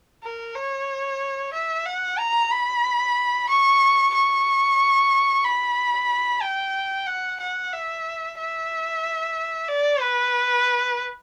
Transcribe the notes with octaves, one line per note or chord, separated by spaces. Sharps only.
A#4
C#5
E5
F#5
A#5
B5
C#6
C#6
B5
G5
F#5
F#5
E5
E5
D5
B4